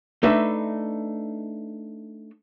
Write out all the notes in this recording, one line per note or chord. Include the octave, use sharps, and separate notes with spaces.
A3 D4 D#4 B4 E5